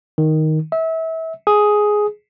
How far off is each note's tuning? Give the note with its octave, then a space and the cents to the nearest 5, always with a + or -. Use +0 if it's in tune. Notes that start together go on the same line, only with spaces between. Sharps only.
D#3 +5
E5 -30
G#4 +5